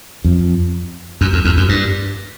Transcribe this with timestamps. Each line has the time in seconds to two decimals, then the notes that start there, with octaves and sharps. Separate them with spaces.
0.24 F2
1.21 F#2
1.33 F2
1.45 E2
1.57 F#2
1.69 G2